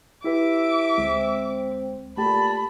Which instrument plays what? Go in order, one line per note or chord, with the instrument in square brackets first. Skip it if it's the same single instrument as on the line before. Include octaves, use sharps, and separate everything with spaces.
[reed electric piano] E4 G4 B4 [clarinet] E5 [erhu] D6
[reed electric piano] D2 G#3 [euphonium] C4
[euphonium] A#2 [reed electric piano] A3 G4 [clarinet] A5 [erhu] B5